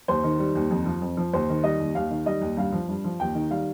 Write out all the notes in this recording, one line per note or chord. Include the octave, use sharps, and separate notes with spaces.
D#2 C5
D#3
G3
D#2
F2
F3
F2
F3
D#2 C5
D#3
G3 D#5
D#2
D#2 F5
D#3
G3 D#5
D#2
G2 F5
F3
G2
F3
D#2 G5
D#3
G3 F5